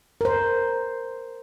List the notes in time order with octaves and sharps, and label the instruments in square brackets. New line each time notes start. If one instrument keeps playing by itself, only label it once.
[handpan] A#4 C5